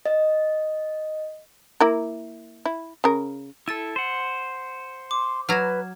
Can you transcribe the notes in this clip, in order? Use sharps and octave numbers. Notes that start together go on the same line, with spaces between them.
D#5
A#3 E4 A#4
E4
C#3 A#4
E4 A4 E6 A6 D#7
C5 F#5
C6 D6
F#3 B4 A#5 F6 G#6 E7